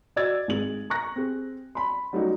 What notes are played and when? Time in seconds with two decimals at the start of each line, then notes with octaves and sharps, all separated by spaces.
0.16 F#4 D5 D#5 E6 G#6 A6
0.48 G#1 G#3 F#7
0.90 A#5 C#6 F#6 A#6
1.16 C4 G4 G#4
1.75 B5 C6
2.13 F#3 G3 A3 C#4 D#4 F#4